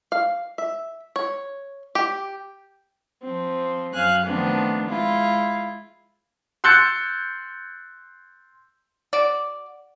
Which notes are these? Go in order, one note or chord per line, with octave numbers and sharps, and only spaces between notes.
F5
E5
C#5
G4
F3 C4
F#2 F5 G#5 F#6
D#3 F3 A3 B3 C4 D4
G#3 E4 F4
C6 E6 F#6 G6 A6 C#7
F#4 D5